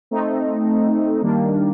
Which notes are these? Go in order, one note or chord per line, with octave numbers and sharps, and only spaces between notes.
A3 C4 D#4
D#3 G3 A#3 D4